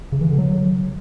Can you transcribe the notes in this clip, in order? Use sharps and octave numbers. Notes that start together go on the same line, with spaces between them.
C#3
E3
D3
F#3